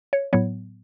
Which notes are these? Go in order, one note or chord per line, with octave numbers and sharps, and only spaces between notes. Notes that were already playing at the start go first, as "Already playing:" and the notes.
C#5
A2 F#3 B3 C#5